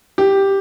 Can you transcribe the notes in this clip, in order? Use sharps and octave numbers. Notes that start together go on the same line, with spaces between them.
G4